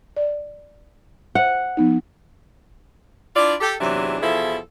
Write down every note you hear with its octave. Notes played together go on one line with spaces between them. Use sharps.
D5
C5 E5 F#5
F3 B3 D#4
D4 E4 F4 D5
G4 A4
E2 G#2 C3 E3 F#3 D4
E2 B2 F3 E4 G#4 A4